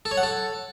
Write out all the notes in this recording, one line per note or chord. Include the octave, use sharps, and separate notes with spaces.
A4
C#5
F#5
A4